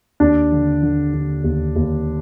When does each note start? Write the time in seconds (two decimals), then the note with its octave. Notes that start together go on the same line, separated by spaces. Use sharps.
0.20 D#2 D4
0.52 D3
0.82 D3
1.14 D3
1.44 D#2
1.76 D#2